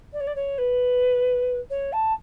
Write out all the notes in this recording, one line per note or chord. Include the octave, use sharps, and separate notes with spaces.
D5
C#5
D5
C#5
B4
C#5
A5